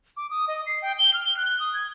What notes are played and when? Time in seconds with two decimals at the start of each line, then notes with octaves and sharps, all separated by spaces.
0.17 D6
0.30 D#6
0.48 D#5
0.66 C7
0.82 G5
0.99 G7
1.14 F6
1.25 G7
1.37 F#6
1.60 D#6
1.74 G#6